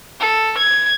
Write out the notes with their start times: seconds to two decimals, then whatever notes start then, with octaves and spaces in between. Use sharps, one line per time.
0.20 A4
0.58 G#6